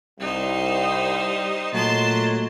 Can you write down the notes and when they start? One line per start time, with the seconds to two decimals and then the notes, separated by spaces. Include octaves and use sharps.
0.20 C2 G3 D#4 C5
1.73 A#2 F#3 A3 A4 D#5 A5 C6